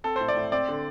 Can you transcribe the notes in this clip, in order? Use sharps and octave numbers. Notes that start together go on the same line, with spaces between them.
C4 A4
C5
A2
D5
A2
C4 D5
D3